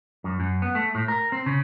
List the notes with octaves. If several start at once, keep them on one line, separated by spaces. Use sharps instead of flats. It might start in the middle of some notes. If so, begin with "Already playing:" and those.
F#2
F#2
B3
A3
A2
A#4
C4
C#3